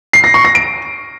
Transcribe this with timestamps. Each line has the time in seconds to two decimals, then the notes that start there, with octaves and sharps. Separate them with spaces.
0.13 C7
0.24 A#6
0.34 C#6
0.45 A#6
0.55 D7